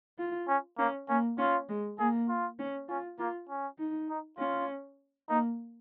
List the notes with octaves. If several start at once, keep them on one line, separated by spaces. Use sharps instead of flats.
F4
C#4
A#3 C#4
A#3 C#4
C#4 F4
G#3
A#3 G#4
F4
C#4
C#4 F4
A#3 F4
C#4
D#4
D#4
C#4 F4
A#3 D#4